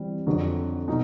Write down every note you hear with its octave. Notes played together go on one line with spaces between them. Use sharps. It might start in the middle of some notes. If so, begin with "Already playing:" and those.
Already playing: E3 G3 C4
F2 D3 F#3
B2 F#3 D#4